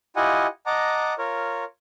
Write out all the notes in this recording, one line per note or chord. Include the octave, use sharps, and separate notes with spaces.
E4 F4 G4 D#5 F#5 G#5
D#5 F#5 A5 A#5 D6
F4 A#4 C#5